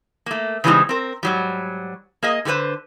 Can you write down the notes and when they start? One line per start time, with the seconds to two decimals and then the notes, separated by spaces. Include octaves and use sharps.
0.26 A3 A#3
0.64 C#3 E3 G3 G#3 C4 D#4
0.89 C4 A#4
1.23 G#2 F#3 G3
2.23 A#3 G#4 D#5
2.45 D3 F#4 G4 B4 C5